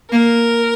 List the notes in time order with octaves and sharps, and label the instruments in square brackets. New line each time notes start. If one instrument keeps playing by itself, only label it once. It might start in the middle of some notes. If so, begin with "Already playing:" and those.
[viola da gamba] A#3 [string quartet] A#4